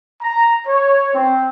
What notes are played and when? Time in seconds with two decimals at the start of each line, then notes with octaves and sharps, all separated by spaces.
0.21 A#5
0.67 C#5
1.14 C4